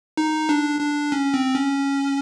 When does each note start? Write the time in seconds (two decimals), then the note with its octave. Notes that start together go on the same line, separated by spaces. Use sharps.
0.17 D#4
0.49 D4
0.81 D4
1.12 C#4
1.34 C4
1.54 C#4